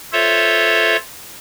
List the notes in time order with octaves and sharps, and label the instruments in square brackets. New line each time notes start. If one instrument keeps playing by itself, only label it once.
[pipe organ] F4 A4 C5 C#5 E5